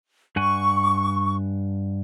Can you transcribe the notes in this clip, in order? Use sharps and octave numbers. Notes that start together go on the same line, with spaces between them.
G2 F#5 G#5 C#6